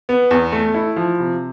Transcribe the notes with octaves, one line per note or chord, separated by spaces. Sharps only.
B3
E2
A3
E4
F3
C3